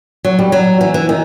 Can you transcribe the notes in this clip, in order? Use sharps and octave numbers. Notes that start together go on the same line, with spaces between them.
F#3
G3
F#3
E3
E3
D#3